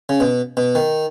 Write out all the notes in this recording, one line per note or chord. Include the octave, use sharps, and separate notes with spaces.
C#3
B2
B2
D#3